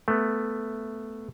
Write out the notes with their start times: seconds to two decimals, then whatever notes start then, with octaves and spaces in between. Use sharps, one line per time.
0.08 A3 B3